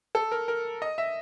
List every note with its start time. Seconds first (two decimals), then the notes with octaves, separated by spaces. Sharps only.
0.15 A4
0.32 A#4
0.48 A#4
0.82 D#5
0.98 E5